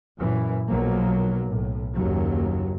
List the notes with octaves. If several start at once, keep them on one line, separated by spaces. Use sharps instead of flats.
F#2 A#2 E3
B1 F3 F#3 A#3
B1 A2
F#1 D#2 F#3